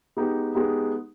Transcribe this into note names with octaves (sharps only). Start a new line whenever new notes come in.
G#3 B3 D#4 G4
G#3 B3 D#4 G4